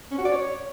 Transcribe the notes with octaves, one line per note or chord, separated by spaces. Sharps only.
C#4
F#4
D5
C#5